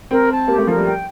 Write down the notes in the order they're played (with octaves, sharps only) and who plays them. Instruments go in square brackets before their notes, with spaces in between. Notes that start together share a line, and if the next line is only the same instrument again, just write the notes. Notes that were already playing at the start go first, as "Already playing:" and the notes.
[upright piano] C4 [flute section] A#4
[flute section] A5
[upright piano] A#3 [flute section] G4
[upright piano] A3
[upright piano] F3 [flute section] A#4
[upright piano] G3
[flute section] G5